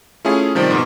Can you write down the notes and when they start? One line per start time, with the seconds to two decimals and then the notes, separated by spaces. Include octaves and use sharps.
0.25 A3 C#4 E4 F4 G#4
0.55 C3 D#3 F3 G3
0.71 G#2 B2